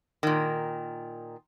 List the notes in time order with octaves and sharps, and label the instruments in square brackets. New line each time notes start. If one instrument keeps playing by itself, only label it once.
[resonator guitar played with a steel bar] A#2 D#3